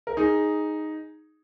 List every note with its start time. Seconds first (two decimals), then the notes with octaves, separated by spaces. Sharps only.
0.07 A#4
0.17 D#4 G#4